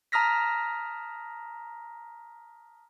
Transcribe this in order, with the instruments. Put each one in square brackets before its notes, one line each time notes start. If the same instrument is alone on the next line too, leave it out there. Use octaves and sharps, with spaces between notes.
[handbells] A5 A#5 D#6 F6 A#6 B6